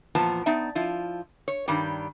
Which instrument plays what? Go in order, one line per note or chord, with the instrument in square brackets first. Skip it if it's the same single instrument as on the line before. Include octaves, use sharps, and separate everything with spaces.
[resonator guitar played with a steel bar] E2 A#2 F3 B3 A5
B3 D#4 D5 E5
F3 E4 F4
C#5
G2 D#3 G3 G4